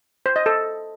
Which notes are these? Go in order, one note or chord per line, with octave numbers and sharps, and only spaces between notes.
C5
D#5
A4